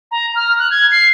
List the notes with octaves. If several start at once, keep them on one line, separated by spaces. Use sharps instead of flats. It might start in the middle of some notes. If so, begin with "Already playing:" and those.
A#5
F6
F#6
G#6
C7